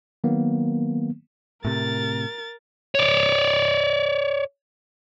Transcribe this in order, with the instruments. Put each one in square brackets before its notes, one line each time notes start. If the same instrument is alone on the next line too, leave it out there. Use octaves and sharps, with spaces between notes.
[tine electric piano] D#3 F#3 A#3 B3
[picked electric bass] A2 C3 [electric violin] A#4 A6
[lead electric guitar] C#5 D5